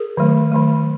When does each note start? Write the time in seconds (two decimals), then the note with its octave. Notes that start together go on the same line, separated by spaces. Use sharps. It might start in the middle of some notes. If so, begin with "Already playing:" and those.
Already playing: G#4 A#4
0.17 D#3 F#3 A3
0.52 D#3 F#3 A3